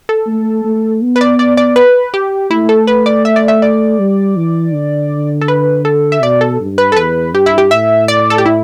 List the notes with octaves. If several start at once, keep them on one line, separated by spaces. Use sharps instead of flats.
A4
A3
A3
B3
B4
D5
D5
D5
B4
G4
A3 E4
A4
B4
D5
E5
D5
E5
D5
G3
E3
D3
A4
B4
A4
E5
B2 D5
A4
G2
B4
A4
E2 B4
G2 G4
E4
G4
A2 E5
D5
A4
G4
E4